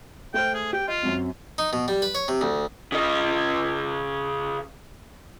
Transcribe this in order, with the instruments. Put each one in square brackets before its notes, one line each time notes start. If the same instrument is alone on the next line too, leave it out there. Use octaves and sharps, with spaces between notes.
[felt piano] A3 C5 F6 [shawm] G5
[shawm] G#4
[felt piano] G4 [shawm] G5
[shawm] F4 [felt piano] D#5
[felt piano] F#2 F#3 C4
[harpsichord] D#4
B2
G3
B4
C#5
C3
D2
[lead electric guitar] C#3 D#5